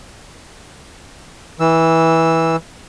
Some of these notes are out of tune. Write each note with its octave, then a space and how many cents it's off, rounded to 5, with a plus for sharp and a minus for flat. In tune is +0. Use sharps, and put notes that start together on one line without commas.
E3 -15 E6 +0